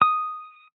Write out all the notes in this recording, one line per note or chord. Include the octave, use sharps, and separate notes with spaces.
D#6